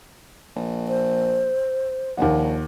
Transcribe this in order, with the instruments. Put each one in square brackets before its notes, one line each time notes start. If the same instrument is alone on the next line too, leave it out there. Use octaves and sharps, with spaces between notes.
[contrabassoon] A#1
[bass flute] C5
[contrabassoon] A#1 [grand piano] D#2 F#5